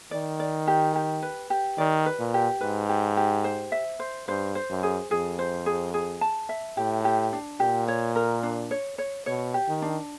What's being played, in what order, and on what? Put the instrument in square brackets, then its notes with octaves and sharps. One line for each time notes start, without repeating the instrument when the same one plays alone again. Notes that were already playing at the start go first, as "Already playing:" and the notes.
[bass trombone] D#3 [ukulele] D5
[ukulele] D5
G4
G4
B4
G4
[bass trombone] D#3 [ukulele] D5
[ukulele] B4
[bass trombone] A#2
[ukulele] G4
[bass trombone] G#2 [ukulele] B4
[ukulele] G4
G4
C5
E5
C5
[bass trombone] G2 [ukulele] C5
[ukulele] C5
[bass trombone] F#2
[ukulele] G#4
[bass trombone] F2 [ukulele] G#4
[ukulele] C5
G#4
G#4
A5
E5
[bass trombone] A2 [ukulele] G4
[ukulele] G4
D4
[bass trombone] A#2 [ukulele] G4
[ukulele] C#5
A#4
D4
C#5
C#5
[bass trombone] B2 [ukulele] C#5
[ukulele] G4
[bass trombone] D#3
[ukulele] D4